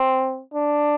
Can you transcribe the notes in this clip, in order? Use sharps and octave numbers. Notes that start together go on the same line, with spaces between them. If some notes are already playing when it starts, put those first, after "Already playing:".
Already playing: C4
D4